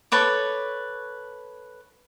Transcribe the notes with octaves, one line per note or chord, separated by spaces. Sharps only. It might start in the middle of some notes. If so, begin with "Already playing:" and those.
A4 B4 C#5 D6